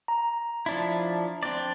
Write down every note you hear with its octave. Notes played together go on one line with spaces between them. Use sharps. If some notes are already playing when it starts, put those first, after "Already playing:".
A#5
F3 D4 E4
C4 D4 D5